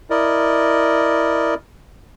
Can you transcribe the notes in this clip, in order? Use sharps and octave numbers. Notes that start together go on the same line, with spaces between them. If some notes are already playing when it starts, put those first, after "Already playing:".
E4 A#4 D5 D#5